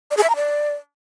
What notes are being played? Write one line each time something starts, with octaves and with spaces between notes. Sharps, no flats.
D5
G#4
E5
A#5
D5